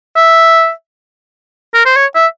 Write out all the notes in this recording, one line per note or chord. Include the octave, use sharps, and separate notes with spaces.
E5
A#4
C5
C#5
E5